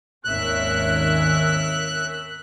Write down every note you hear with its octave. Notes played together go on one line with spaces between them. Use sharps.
G#1 D#2 C#4 A#4 E5 F#6